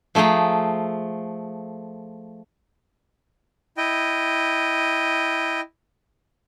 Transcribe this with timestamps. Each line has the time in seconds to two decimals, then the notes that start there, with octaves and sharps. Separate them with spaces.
0.15 F3 A3 G#4 G5 A#5
3.77 E4 D#5 G5